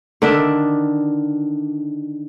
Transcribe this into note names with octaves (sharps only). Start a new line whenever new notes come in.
D3 D#3 D4 E5